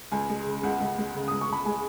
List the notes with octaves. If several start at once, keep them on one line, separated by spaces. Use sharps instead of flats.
C#2 G#5
G#3
C#3
C#2 F#5
C#2
G#3
C#3
C#2 D#6
C#6
C#2 B5
G#3 G#5